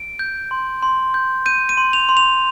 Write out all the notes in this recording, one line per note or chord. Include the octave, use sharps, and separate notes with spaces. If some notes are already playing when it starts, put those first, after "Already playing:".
Already playing: D7
G6
C6
C6
G6
G6 D#7
D#7
C6
F7
C6
F7